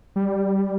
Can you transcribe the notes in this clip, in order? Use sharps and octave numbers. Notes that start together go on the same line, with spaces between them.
G3